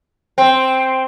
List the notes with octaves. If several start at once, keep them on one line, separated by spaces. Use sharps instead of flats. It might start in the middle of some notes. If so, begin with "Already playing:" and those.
C4